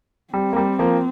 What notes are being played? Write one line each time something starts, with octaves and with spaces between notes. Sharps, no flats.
G3 C4
A#3
G3
F3 A#3